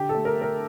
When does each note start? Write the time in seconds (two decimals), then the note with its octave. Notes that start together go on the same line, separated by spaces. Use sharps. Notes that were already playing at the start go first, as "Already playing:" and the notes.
Already playing: D3 G4
0.09 A4
0.15 A3
0.25 A#4
0.36 A3
0.42 A#4